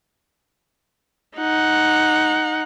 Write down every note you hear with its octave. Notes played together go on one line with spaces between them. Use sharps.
D#4 F#5